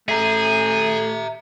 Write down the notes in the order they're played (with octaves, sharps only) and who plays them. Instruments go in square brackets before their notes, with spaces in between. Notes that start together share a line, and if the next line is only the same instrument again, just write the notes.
[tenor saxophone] A3 [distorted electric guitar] G#4 [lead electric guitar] E5 A#5